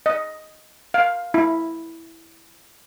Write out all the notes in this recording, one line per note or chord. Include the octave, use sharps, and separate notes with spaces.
D#5
F5
E4